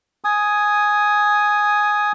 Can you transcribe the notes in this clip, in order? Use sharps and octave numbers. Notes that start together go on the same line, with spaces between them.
G#5 D#6